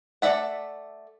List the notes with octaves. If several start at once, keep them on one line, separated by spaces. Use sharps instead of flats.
A3 D#4 D5 E5 F#5